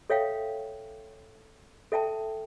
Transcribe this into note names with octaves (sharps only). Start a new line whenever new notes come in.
A4 C#5 E5 F5 G5
A4 E5 G5 A5